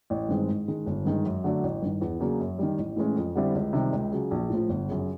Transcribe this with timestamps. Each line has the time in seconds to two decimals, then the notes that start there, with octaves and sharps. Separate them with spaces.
0.10 A1
0.29 G2 D#3 G#3 C4
0.48 G#2
0.68 D#3 G#3
0.86 G1
1.05 G2 D#3 G#3
1.25 F#2
1.44 D3 F#3 A3 D4
1.63 A1
1.82 G2 D#3
2.01 E2
2.20 C#3 F#3 A#3 D4
2.40 F#2
2.59 D#3 G3
2.78 A1
2.96 A2 E3 G#3 C#4
3.16 F2
3.35 D3 G3 C4 E4
3.54 C#2
3.73 C3 D#3 G3
3.92 C#2
4.11 C#3 F#3
4.31 A#1
4.50 A2 F3
4.69 G1
4.88 F#2 C#3